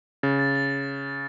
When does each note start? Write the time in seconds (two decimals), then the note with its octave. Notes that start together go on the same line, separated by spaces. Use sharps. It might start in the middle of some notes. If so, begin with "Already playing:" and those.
0.23 C#3 A6
0.39 A6
0.56 A6